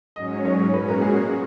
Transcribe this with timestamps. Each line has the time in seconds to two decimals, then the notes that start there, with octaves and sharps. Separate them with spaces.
0.16 G#2 F#3 C#4 D#5
0.45 C#5
0.73 A#2 G#3 C#4 F#4 B4
0.88 A#4
1.02 G#4